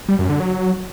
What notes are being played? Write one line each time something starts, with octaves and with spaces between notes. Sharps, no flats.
G3
F#2
D3
F#3